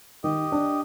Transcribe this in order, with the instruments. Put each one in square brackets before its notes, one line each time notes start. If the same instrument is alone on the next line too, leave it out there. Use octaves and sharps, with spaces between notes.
[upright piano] D#3 [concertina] G4 D#5
[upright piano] D4